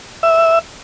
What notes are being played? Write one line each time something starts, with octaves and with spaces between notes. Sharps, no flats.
E5